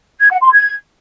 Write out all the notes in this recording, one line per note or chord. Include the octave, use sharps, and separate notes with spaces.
G#6
F#5
C6
G#6